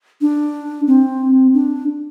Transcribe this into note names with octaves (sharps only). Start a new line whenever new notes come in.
D4
C4
D4